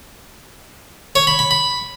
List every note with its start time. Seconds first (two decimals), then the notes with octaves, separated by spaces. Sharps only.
1.15 C#5
1.27 B5
1.39 B5
1.51 B5